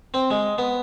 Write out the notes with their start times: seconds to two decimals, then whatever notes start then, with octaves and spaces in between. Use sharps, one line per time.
0.14 C4
0.30 G#3
0.58 B3